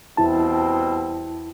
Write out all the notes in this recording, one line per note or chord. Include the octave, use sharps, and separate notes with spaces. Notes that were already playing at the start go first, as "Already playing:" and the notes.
E2 B2 G3 C4 E4 A5